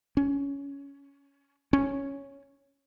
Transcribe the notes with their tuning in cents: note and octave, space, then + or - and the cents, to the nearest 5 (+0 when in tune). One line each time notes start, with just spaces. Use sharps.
C#4 +15
C#4 +0